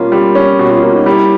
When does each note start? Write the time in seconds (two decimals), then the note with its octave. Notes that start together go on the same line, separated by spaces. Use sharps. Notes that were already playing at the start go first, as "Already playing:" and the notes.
Already playing: B2 G3 A#3 C#4 F4
0.12 G3
0.35 C#4
0.59 B2 F#4
0.71 F4
0.83 A#3 F4
0.94 D#4
1.06 G3 E4